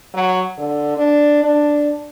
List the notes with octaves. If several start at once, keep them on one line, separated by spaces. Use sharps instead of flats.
F#3
D3
D4
D4